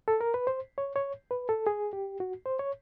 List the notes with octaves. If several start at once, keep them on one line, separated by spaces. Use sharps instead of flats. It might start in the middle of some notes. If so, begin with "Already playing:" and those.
A4
A#4
B4
C5
C#5
C#5
B4
A4
G#4
G4
F#4
C5
C#5